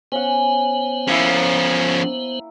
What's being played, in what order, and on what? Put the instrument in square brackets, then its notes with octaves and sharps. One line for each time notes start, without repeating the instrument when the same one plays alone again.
[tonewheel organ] B3 C5 [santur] C#4 F#5
[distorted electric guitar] F3 C#4 [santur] A#3 E4